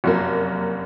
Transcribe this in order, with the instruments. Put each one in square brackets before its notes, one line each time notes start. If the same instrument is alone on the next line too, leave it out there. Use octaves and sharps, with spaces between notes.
[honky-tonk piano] F1 F#2 A#3